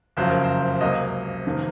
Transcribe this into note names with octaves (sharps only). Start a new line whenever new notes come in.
F#1 F2 C#3 F#3 C5
A#4
C5
C#2 C3 F#3 A#3 D#5
F1 C3 D#3 A#3